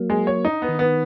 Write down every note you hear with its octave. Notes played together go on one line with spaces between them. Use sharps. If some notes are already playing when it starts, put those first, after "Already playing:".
Already playing: F#3 A#3
G#3
C#5
D#4
B3
D#3
B3